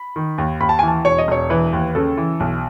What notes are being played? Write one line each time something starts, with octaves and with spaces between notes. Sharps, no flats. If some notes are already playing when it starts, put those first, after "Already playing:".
Already playing: B5
D#3
D#2
D#2 B5
A5
E3 G#5
A5
E1 C#5
D#5
E1 C#5
E3 B4
D#2
C#3 A4
E3
B1